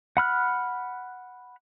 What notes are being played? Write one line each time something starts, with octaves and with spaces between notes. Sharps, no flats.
F#5 B5 F6 F#6